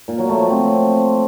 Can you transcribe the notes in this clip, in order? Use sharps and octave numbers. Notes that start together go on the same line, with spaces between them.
A#2
F#3
A3
F3
C4